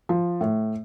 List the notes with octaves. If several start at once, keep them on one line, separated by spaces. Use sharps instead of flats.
F3
A2